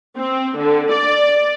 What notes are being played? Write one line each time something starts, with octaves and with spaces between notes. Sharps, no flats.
C4
D3
D5